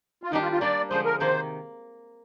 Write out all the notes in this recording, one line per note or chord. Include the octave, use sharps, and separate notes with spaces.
F4
D#3 G3 D4 D#4 G4
F4
F4
G3 A#3 D4 D5
D3 F3 G#3 C5
A#4
C3 D#3 A#3 C5